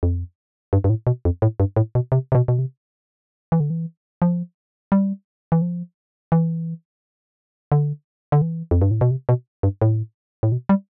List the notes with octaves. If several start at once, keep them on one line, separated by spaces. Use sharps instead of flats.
F2
G2
G2
A2
B2
F2
A2
G2
A2
B2
C3
C3
B2
B2
C3
E3
D3
E3
F3
G3
E3
F3
E3
D3
D3
E3
F2
G2
A2
B2
C3
B2
G2
A2
A2
B2
G3